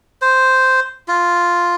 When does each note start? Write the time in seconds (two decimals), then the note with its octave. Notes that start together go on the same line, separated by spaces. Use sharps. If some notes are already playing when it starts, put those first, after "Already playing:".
0.22 C5
1.08 F4